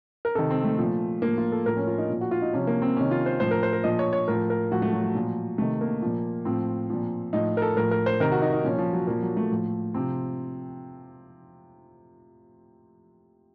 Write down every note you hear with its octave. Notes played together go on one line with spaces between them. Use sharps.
A#4
C3 D#3 A4
C4
A3
A#2 F3
A2 F3 A#3
F4
A4
A2 F3 A#4
C#4
F4
D#4
A#2 F3
F#4
F4
D#4
C3 F3 C#4
A#3
C4
C3 D#3 C#4
F4
C5
A2 F3 C5
A#4
C5
A#4
A#2 F3 D#5
C#5
C#5
A2 F3 A#4
A#4
A2 F3 F#4
A3
F#3
F#3
A#2 F3
C3 D#3 A3
A#3
A#2 F3
A2 F3 C4
A#2 F3
A2 F3 D#4
A#4
A4
A2 F3 A#4
A#4
C5
C3 D#3 A#4
F#4
D#4
D#4
A#2 F3 C#4
F3
F#3
A#2 F3 A#3
F#3
A3
A2 F3
C3 F3 C4